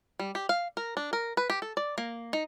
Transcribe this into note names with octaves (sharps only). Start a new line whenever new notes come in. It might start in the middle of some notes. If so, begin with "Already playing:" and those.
G3
G4
F5
A#4
D4
A#4
B4
G4
A4
D5
A#3
D#4